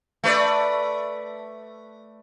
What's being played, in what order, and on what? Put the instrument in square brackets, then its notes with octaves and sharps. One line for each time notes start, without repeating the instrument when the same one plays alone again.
[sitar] A3 B4 D5